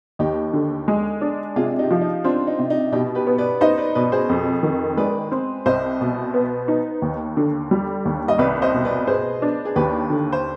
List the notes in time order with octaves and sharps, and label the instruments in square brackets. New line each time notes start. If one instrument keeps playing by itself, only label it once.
[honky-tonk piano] D#2 [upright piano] D#4 G4
[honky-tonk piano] D3
G#3
D4
[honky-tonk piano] C3 [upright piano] F4 G#4
[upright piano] D#4 G4
[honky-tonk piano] F3
[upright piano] D#4
[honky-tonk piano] C4 [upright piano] D4 F4
[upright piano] D#4
[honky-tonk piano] C3
[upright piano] D#4
[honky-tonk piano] B2 [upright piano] D#4 G4
[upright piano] G4 B4
[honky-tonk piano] B3
[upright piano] B4 D5
[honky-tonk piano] D#4 [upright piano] C5 D#5
[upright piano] B4 D5
[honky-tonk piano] B2 [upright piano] B4 D5
[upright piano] G#4 C5
[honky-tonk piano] F2
D#3
[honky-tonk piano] G#3 [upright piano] B4 D5
[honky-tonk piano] C4
[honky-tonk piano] C2 [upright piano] C5 D#5
[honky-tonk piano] B2
B3
D#4
D#2
D3
G3
D#2
[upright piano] D#5
[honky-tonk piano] C2 [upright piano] B4 D5
[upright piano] C5 D#5
[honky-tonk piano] B2
[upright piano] B4 D5
[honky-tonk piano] B3 [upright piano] G#4 C5
[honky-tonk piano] D4
[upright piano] G#4
[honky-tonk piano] D#2 [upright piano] G4 B4
[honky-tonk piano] D3
[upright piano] C5